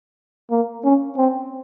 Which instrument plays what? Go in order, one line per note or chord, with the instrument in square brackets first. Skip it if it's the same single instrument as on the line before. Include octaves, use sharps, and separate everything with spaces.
[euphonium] A#3
C#4
C4